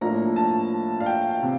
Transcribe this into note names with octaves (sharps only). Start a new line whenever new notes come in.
A2 F3 A#3 D4 A#5
A5
F5
G5
C3